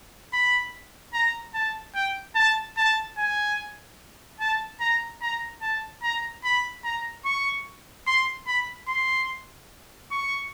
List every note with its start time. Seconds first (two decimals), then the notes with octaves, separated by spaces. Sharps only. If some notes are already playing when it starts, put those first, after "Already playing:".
0.33 B5
1.14 A#5
1.54 A5
1.95 G5
2.35 A5
2.77 A5
3.18 G#5
4.40 A5
4.80 A#5
5.21 A#5
5.62 A5
6.03 A#5
6.44 B5
6.84 A#5
7.25 C#6
8.07 C6
8.47 B5
8.88 C6
10.11 C#6